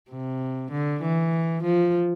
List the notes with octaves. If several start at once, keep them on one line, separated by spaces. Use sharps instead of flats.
C3
D3
E3
F3